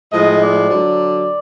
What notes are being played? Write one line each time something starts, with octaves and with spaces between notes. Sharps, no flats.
A2 F3 G#3 D#5
D5
D3 F#3